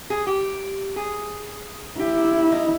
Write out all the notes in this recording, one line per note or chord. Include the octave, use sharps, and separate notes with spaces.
G#4
G4
G#4
E4 G4
D#4